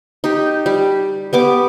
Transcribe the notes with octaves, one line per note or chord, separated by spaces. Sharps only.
D#4 G4
G3
G3 B3 D6